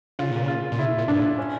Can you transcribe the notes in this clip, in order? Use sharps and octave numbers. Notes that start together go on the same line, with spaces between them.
C#3 F4
A#2
C#3
F4
A#2
C#3 E4
A#2
G2 D4
A2
C#4